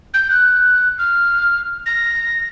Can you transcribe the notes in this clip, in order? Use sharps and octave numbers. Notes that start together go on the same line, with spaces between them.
G6
F#6
F6
A#6